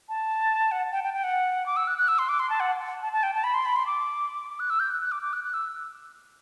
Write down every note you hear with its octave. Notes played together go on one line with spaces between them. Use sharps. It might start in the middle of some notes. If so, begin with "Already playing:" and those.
A5
F#5
G5
G5
G5
F#5
D6
E6
F#6
F#6
E6
C6
D6
C6
A5
F#5
A5
A5
G5
A5
B5
C6
B5
C6
D6
D6
F#6
E6
G6
F#6
F#6
D6
D6
F#6
F#6
E6